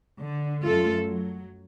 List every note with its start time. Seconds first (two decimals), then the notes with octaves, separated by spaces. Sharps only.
0.22 D3
0.65 F#2 A3 F4 A4
1.04 F#3